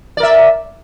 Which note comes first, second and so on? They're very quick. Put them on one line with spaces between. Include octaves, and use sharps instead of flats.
D5 A#4 E5